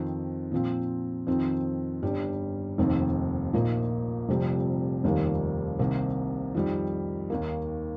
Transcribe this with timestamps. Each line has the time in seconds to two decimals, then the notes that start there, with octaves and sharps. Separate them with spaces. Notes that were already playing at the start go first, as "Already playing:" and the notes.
Already playing: F2 D#3 C4
0.52 A#2 F3 C4
1.27 F2 D#3 C4
2.03 G1 G2 G3
2.78 F1 D#2 D#3 C4
3.53 A#1 A#2 A#3 D#4
4.29 F1 F2 C3 G3
5.04 F1 D#2 D#3 G3 A#3
5.79 C2 C3 D#3 A#3
6.55 F2 D#3 G3
7.30 D#2 D#3 A#3